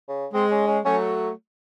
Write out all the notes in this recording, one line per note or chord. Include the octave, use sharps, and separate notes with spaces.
C#3
G#3 C4
C#4
C#4
F#3 A3 C#4